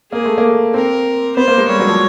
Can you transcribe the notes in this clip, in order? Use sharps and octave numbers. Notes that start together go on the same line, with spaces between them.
A#3 G#4
A3
A#3
C4 A#4
B3 C5
A#3
G#3
G3 C#5
F#3
F3